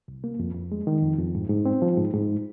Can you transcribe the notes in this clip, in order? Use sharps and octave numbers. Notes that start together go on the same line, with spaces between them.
C2
A#3
F2
F2
G#3
D#3
F2
F2
G#2
G#2
C4
F3
G#2
G#2